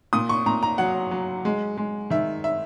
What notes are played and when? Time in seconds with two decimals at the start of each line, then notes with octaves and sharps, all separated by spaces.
0.13 A#2 D#6
0.29 C#6
0.46 A#2 A#5
0.63 A#5
0.78 F#3 F#5
1.11 F#3
1.45 G#3
1.77 G#3
2.10 D#3 E5
2.44 E5